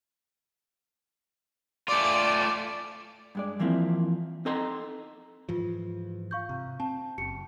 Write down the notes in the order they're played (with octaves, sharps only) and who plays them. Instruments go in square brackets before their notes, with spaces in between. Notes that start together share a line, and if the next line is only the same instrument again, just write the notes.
[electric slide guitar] A3 F4 [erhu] D5
[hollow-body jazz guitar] G2 G#3 D5
E3 F3 A#3 C4 E4
C4 D#4 A4 D#5 A#5 C6
[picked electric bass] G#2 E3 F3 [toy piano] F4 G4
[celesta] F5 C#6 G6
[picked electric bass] C3 [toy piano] G4 A#5
[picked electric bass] C4 [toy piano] A5
[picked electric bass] F#1 [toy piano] C#4 G4 [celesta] C#7